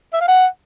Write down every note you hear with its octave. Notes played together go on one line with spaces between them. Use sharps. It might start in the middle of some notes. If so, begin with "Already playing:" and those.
E5
F5
F#5